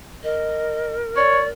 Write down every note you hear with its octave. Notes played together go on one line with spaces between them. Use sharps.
A#4 D#5
C#5 D5